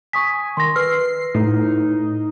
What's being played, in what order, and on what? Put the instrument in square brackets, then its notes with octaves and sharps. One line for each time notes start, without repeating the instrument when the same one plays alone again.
[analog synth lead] G#5 [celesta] C#6 D#6 B6
[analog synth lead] D#3 [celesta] C6 A#6
[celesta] B4 E6 F6 [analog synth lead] C7
[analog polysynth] A2 [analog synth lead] D#4